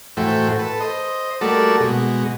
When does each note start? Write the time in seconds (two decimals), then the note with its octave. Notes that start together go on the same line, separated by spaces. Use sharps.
0.17 A2 E3 A3 F#4 C5 G5
0.59 A4 B4
0.80 C5 D#5
1.41 G3 A3 A#3 F#4 A4 D5
1.80 B2 G#3 F#4